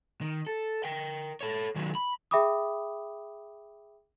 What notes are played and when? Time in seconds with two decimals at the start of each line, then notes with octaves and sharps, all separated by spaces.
0.21 D#3
0.47 A4
0.84 A#4 G5
1.41 A4 C#5
1.76 D#3 F#3
1.95 B5
2.31 G#4 E5 G5 B5 D6 D#6